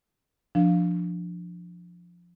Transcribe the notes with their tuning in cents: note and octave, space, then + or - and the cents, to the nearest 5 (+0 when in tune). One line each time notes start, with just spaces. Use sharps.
F3 +0 D4 +0 F5 +0